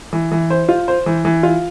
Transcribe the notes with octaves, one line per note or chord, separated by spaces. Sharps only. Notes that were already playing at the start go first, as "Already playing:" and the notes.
E3
E3
C5
F4
C5
E3
E3
F4